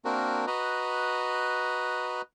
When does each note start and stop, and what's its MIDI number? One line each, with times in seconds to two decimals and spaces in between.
0.05 0.45 58
0.05 0.45 60
0.05 0.45 62
0.05 0.45 66
0.05 0.45 70
0.47 2.22 66
0.47 2.22 71
0.47 2.22 75
0.47 2.22 82